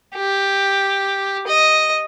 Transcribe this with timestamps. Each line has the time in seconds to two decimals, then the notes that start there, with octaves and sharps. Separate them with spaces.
0.15 G4
1.47 D#5